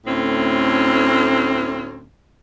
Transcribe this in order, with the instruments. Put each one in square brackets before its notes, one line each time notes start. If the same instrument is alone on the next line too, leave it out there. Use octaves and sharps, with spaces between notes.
[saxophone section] D2 A2 C4 C#4